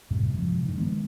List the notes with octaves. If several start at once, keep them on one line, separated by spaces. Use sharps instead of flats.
F#2 A2 C3 G3
C3 F3 G#3
G2 D#3
D#3 G#3 A#3 B3